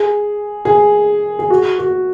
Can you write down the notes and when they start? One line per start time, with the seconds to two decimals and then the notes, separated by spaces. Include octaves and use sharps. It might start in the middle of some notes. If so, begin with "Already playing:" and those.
Already playing: G#4
0.65 G#4
1.39 G#4
1.50 F#4
1.79 F#4